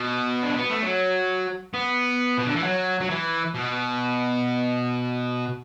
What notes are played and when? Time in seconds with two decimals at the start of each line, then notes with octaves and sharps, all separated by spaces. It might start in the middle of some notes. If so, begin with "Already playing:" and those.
Already playing: B2
0.43 D4
0.57 B3
0.70 A3
0.83 F#3
1.74 B3
2.38 B2
2.46 D3
2.56 E3
2.64 F#3
3.00 F#3
3.10 E3
3.55 B2